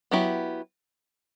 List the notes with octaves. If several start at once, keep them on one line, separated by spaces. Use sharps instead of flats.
F#3 B3 E4 G4